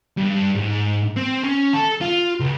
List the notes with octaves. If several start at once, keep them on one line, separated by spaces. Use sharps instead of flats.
G2
G#2
C4
C#4
A4
F4
C#2